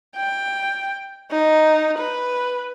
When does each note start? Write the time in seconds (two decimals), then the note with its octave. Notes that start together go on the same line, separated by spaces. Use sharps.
0.16 G5
1.31 D#4
1.99 B4